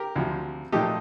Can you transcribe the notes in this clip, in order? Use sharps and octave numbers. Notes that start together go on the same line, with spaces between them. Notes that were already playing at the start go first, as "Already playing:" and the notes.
Already playing: G4 A#4
D2 C3 F3
A#2 F3 A3 D#4 G4